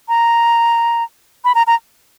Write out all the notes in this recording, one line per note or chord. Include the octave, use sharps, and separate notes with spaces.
A#5
B5
A#5
A#5